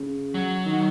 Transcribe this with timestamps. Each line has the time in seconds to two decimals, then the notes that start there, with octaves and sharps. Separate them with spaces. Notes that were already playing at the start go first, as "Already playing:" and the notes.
Already playing: C#3
0.34 F#3
0.65 D#3